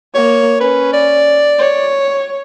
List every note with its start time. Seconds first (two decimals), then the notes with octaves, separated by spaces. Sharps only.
0.14 A#3 C#5
0.60 C#4 B4
0.93 D5
1.58 C#5